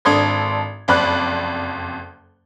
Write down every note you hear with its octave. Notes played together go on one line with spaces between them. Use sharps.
G#1 D4 A4 C6 D#6 G#6
F#1 F2 D5 B5 F#6